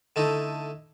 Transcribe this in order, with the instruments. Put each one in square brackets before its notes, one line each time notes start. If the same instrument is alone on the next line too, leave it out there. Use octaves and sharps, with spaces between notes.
[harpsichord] D3 A3 D#4 E4